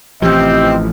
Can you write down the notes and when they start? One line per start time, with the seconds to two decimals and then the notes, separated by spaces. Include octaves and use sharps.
0.22 A1 C3 E3 F3 C4 G4 D#5